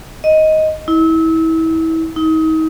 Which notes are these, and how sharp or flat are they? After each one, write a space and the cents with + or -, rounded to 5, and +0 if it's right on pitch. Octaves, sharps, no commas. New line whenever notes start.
D#5 +10
E4 -30
D#4 +35